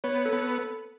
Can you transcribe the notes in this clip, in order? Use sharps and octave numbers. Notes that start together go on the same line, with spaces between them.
B3 C#5
A4
B3